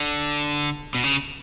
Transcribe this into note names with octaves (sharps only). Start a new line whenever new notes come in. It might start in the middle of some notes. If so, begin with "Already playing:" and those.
Already playing: D3
B2
C#3